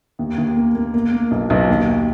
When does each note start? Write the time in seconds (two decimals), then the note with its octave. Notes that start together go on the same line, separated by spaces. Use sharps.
0.19 D#2
0.38 D#2
0.56 A#3
0.75 A#3
0.94 A#3
1.12 A#3
1.31 B1
1.50 B1
1.69 D#2
1.88 D#2